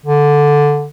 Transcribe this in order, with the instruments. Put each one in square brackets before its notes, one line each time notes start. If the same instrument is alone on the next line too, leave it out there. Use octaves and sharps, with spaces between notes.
[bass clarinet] D3